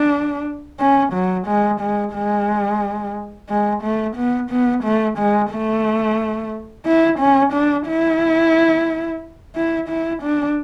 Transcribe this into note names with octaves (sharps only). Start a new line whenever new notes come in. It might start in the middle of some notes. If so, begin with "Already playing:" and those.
Already playing: D4
C#4
F#3
G#3
G#3
G#3
G#3
A3
B3
B3
A3
G#3
A3
E4
C#4
D4
E4
E4
E4
D4